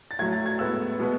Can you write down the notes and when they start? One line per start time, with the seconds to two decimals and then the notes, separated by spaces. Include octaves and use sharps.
0.11 A6
0.19 A2 F#3 A3 G#6
0.32 A6
0.46 G#6
0.59 A2 G#3 B3 E6
0.99 B2 G#3 B3